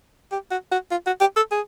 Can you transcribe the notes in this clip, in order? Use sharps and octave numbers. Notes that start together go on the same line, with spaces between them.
G4
F#4
F#4
F4
F#4
G4
A4
G#4